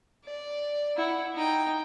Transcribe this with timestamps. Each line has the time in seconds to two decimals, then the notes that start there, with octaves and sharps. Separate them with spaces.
0.24 D5
0.97 E4 F#5
1.35 D#4 G5